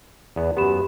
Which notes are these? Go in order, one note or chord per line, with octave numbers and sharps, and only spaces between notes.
E2 B3
F#2 B3 G4 B5 E7